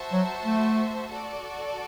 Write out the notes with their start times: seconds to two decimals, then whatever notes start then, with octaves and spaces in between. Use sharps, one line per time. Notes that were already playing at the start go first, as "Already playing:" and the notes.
Already playing: F#4 C5 E5 A5
0.12 F#3
0.45 A3
1.10 F#4 A4 D5